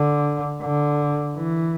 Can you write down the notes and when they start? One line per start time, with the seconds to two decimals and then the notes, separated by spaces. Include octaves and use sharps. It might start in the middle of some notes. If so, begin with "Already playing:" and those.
Already playing: D3
0.62 D3
1.36 E3